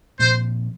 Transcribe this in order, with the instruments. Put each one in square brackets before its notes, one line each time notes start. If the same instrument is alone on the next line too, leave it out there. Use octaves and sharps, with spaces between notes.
[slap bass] A#2 F3 C4 [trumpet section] C5